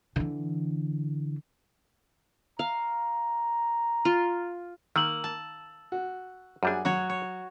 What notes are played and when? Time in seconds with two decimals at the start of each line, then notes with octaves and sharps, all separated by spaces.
0.16 D3 E3
2.59 F5 A#5
4.05 F4
4.96 D#3 A#3 E6 F#7
5.24 A5
5.92 F#4
6.63 F#2 G3 D4 F#4 G#4 G#5
6.85 F#3 F#4 C#5
7.10 C#5